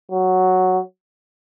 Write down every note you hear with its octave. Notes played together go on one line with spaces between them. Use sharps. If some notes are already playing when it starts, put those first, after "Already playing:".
F#3